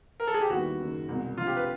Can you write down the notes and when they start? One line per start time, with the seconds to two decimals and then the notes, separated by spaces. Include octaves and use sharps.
0.20 A#4
0.27 A4
0.34 G#4
0.42 G4
0.49 D#2 D#3 G3 B3 E4 F#4
0.79 F#1 F#2 D#3
1.09 C2 B2 G#3
1.37 D2 C3 F3 F4
1.47 G4
1.57 B4